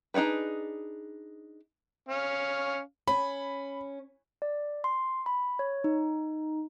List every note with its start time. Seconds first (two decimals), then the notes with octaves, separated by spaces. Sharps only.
0.14 D4 D#4 F#4 G#4 B4
2.09 C#4 F5
3.08 C#4 B5
4.42 D5
4.84 C6
5.26 B5
5.59 C#5
5.84 D#4